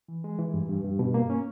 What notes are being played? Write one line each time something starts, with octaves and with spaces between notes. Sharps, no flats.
E3
G#3
E3
G2
G2
G2
B2
A#3
C#4